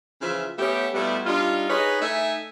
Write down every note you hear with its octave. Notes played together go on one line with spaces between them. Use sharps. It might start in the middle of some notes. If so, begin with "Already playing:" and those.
C#3 E3 F3 F4 E5
A3 B3 C#4 G4
B2 G3 A3 B3 E4 F4
G3 D4 D#4 F4
D#4 G#4 B4 C#5 D#5
A3 D#4 E5 G#5